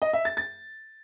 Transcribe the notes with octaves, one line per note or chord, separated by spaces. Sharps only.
D#5
E5
A6
A6